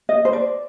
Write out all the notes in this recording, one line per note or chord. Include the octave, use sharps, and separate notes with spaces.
D#5
C5
D5